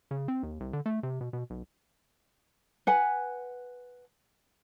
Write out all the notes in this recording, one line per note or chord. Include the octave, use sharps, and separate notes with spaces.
C#3
C4
D#2
C2
D3
A3
C3
B2
B2
B1
B4 F#5 G#5